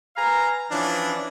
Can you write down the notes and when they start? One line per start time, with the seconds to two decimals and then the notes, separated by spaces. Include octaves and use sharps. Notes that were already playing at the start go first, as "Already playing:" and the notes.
0.17 B4 F5 G#5 A#5
0.71 E3 F3 C#4 D4